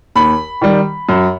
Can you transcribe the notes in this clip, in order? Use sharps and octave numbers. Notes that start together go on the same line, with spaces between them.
D#2 B5
D#3 G3
F#2